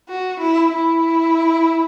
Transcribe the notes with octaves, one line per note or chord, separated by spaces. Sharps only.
F#4
E4
E4